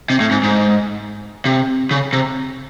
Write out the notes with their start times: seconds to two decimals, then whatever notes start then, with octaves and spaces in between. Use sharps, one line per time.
0.10 C3
0.20 A2
0.31 G#2
0.43 G#2
1.45 C3
1.91 C#3
2.13 C3